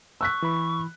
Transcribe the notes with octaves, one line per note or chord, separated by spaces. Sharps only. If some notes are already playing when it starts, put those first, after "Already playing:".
C#6 E6 F#6 B6
E3 B5